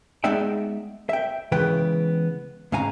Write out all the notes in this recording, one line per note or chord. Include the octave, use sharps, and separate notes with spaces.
G#3 B3 D#4 D5 E5 G5
E5 G5
C#3 E3 G#3 B3 B4 G5
G#2 C#3 F5 G#5 A#5